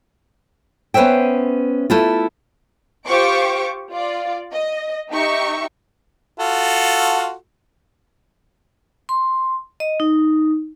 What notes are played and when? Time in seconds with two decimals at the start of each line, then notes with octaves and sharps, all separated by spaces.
0.94 B3 C#4 B4 C5 E5 G5
1.90 A3 E4 F4
3.07 F4 G4 C5 C#6 D6
3.91 F4 D5
4.53 D#5
5.11 D#4 G4 E5 C#6
6.39 F4 F#4 A4
9.09 C6
9.80 D#5
10.00 D#4